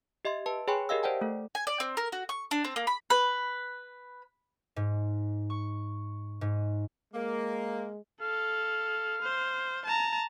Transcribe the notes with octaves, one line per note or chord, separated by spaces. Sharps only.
G4 D#5 E5 C6
B4 A5
G#4 C#5 G5 G#5 B5 C6
G4 A#4 D#5 F5 E6
C5 D5 F#5 G5 A5
A3 A4
G#5
D5
C4
A#4
F#4
C#6
D4
C4
A#3
B5
B4
G#2
C#6
G#2
G#3 A#3
A4 F5
C5
A5 A#5